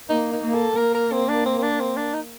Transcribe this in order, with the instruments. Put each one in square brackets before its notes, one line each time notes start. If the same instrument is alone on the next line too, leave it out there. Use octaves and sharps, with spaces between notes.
[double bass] A#3 [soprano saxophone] D#4
[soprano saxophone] D#4
[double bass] A#3
[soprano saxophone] A4
[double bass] A#3 [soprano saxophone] A#4
[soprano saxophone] A#4
C4
D4
C4
C4
D4
C4
D4
D#4